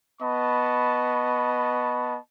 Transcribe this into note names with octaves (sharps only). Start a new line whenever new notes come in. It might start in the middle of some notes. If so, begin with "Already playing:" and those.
B3 D#5 A5 B5 C#6